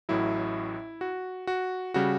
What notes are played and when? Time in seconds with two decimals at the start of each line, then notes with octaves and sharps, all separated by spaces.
0.09 A1 A2 F#3 E4
1.01 F#4
1.47 F#4
1.94 C#3 G3 F#4